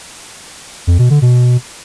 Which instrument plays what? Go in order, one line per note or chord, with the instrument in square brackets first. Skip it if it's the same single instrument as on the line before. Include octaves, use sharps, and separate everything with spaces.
[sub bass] F2
B2
D3
B2